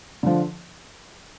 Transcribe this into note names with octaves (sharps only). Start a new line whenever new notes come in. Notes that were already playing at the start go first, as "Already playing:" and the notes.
D3 F3